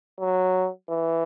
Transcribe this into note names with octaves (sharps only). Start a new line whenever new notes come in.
F#3
E3